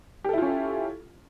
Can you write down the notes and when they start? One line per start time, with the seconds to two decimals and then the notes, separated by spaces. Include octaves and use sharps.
0.24 G4
0.29 A4
0.33 E4
0.38 F4
0.42 C#4